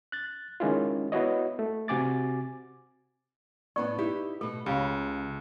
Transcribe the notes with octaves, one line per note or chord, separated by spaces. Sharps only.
F#6 A6
D#3 G#3 C#4 E4 F4
B3 E4 F#4 C#5 D#5
A3
C3 F#4 G#5 D6 A6
A2 B3 D4 D5 C#6
D#4 E4 G4
B2 A3 A4
C#2 C#3 G4 F5 B5